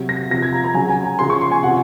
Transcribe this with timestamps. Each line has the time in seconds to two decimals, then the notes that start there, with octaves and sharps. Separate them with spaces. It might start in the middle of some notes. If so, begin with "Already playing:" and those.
Already playing: C3 F#3
0.09 A#6
0.30 C3 F3 A#6
0.42 G#6
0.53 A#5
0.64 A#5
0.74 C#3 F#3 G#5
0.90 G#5
1.04 A#5
1.18 C#3 F3 C6
1.30 C#6
1.41 C6
1.51 G#5
1.63 C3 F3 F#5